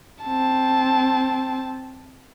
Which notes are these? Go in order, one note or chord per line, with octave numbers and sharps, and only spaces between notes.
C4 A5